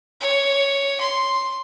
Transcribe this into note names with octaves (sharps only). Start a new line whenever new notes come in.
C#5
C6